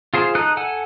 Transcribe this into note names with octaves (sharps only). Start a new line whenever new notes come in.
F4 G#4 C5
D#4 A4 D#6 F#6
A4 F#5 G#5